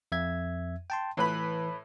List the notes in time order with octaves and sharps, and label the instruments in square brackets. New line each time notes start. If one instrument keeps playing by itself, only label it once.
[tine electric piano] F2 E5 G#6
G5 A5 C6
[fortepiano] A2 B4 B5 [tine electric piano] E3